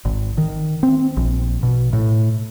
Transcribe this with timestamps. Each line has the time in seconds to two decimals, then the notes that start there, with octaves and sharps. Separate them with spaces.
0.05 G#1
0.38 D#3
0.83 C4
1.17 A#1
1.63 B2
1.93 A2